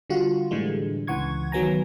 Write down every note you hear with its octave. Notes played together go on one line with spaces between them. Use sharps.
D3 G3 F4 F#4
A2 D3 E3 G3 G#3
C#2 E3 F#5 C#6 G#6
D#3 F#3 B3 G#5 A#5